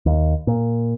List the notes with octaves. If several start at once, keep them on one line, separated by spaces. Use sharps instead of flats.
D#2
A#2